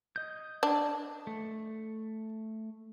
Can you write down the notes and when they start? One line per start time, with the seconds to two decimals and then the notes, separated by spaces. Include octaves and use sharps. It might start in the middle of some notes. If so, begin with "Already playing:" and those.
0.16 D#5 G6
0.63 D4
1.27 A3